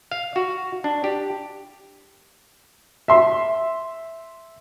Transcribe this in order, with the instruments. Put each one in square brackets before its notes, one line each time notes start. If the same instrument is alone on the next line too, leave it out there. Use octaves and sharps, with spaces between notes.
[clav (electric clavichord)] F5
F#4
D4
G4
[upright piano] E5 C6